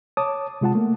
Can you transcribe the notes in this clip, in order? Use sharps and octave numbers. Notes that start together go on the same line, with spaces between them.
C#5 A5 D6 D#6
C3 G#3 F4 F#5 A5
A3 A#3